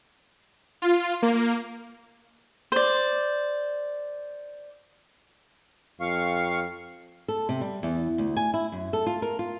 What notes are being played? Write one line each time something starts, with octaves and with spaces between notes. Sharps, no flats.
F4
A#3
C5 D5
F2 F5 C#6
A4
C3
G3
E2
D2
G#5
E4
F#2
A4
F4
A#4
F4